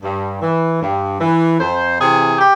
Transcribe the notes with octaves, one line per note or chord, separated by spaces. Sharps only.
G2
E3
G2
E3
F2 C5
C3 E3 G#4
G4